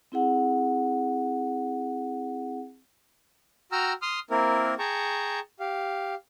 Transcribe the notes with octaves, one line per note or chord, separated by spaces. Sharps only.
C4 E4 G#4 F#5
F#4 G5 A#5 E6 F6
C6 D#6 F6
A#3 C4 E4 A#4
G#4 G5 A5 A#5 C#6
G4 F5